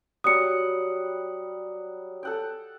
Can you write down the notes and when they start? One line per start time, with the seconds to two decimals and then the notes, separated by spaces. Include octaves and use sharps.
0.24 F#3 G3 F#5 D#6 C#7
2.23 A4 F#5 G5